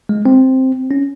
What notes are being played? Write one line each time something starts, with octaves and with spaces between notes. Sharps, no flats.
G#3
C4
C#4